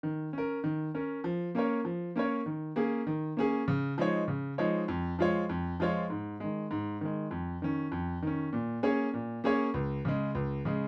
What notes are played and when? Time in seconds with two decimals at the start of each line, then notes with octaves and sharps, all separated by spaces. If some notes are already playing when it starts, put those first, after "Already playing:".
0.03 D#3
0.33 C#4 A#4
0.64 D#3
0.95 C#4 A#4
1.24 F3
1.55 A#3 C#4 A#4 C#5
1.85 F3
2.16 A#3 C#4 A#4 C#5
2.46 D#3
2.76 A#3 C#4 G#4
3.07 D#3
3.37 A#3 C#4 G#4
3.68 C#3
3.98 F3 G#3 D#4 C#5
4.28 C#3
4.58 F3 G#3 D#4 C#5
4.88 F2
5.19 F3 G#3 F4 C#5
5.49 F2
5.80 F3 G#3 F4 C#5
6.10 G#2
6.40 D#3 G#3
6.71 G#2
7.01 D#3 G#3
7.31 F2
7.62 D#3 C#4
7.92 F2
8.22 D#3 C#4
8.53 A#2
8.83 A#3 C#4 G#4 C#5
9.14 A#2
9.44 A#3 C#4 G#4 C#5
9.74 C#2
10.05 C#3 G#3
10.35 C#2
10.65 C#3 G#3